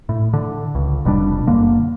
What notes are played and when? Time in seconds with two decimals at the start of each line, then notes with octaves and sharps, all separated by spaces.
0.09 A2
0.33 D3
0.75 C#2
1.05 F1 B2 G3 D4
1.47 F#1 D3 A#3